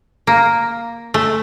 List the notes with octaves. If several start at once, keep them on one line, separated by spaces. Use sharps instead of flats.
A#3
A3